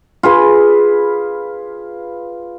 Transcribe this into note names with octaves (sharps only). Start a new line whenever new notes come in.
F4 G#4 B4